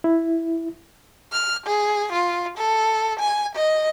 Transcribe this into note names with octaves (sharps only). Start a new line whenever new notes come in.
E4
F6
G#4
F4
A4
G#5
D#5